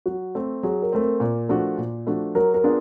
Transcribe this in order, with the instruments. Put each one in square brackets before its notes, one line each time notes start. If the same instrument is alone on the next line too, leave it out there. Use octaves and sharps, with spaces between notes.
[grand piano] F#3 [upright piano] F#4
[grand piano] A3 C4
[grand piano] F#3 [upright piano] G#4
[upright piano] A#4
[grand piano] A3 C4
[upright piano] A#4
[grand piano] A#2
F3 A3 D4 F#4
A#2
F3 A3 D4 F#4
[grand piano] F#3 [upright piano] A#4
[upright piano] A#4
[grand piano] B3 D4 F4 G#4